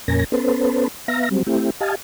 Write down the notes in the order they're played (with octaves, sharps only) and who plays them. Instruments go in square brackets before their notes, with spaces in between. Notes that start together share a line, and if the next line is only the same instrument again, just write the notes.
[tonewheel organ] F2 A#2 C#4 A#4 G#5 A#6
B3 C#4 A4 B4 C5
B3 E5 F5 A#5 A#6
F#3 G3 C4
A3 C4 E4 G4
G4 D#5 F5 G#5 A5